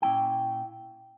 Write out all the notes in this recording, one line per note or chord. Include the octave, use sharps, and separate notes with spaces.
A#2 G#3 C#4 E4 G5